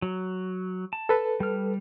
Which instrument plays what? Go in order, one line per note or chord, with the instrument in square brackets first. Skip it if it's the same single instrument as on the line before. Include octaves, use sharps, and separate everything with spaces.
[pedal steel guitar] F#3
A5
[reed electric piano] A4 B4
[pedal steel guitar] G3 F6